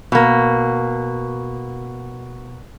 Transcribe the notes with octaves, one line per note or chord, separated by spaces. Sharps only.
B2 A#3